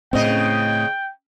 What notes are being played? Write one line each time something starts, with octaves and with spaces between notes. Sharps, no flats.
A2 C#3 C4 D#5 G5